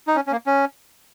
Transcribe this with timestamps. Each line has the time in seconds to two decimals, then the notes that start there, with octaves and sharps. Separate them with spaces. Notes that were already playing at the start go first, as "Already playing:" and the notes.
0.07 D#4
0.16 C#4
0.27 C#4
0.32 A#3
0.47 C#4